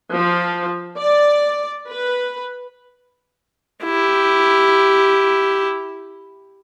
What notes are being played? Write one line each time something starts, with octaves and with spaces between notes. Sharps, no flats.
F3
D5
B4
E4 G4